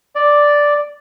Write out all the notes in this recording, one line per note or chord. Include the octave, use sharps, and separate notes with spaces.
D5